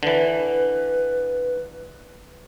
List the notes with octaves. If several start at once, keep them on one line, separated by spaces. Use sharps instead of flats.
D3 E3 B4